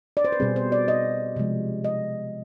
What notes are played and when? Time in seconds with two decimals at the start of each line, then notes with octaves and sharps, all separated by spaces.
0.17 D5
0.25 C5
0.32 B4
0.40 B2 G3 C4 G#4
0.56 C5
0.72 D5
0.88 D#5
1.36 C3 F3 G#3
1.84 D#5